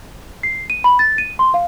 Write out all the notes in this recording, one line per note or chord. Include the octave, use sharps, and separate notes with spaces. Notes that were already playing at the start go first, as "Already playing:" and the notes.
C7
D#7
B5
A6
D#7
C6
F5